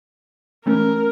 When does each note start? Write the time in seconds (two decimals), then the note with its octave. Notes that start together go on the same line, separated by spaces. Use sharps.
0.66 E3 A3 C#4 A#4